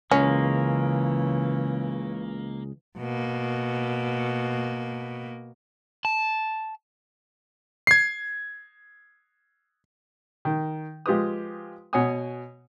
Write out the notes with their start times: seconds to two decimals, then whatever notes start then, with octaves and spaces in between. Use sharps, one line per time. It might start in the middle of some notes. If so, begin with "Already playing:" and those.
0.12 C#2 C#3 E3 G#3 A#3 C#4
2.98 B2 A#3
6.05 A5
7.87 G#6 C7
10.45 D#3
11.06 F3 G#3 F4 G4 B4 D#6
11.93 B2 C#5 F#5 G#5 D#6